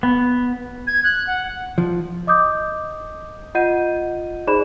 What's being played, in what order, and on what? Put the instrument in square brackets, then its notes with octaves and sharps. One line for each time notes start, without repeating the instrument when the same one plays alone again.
[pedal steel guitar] B3
[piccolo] G#6
F#6
F#5
[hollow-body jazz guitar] F3
[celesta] D#5 D6 D#6 G6
F4 D#5 F#5 G6 D#7
D#4 G#4 C5 D5 B5 E7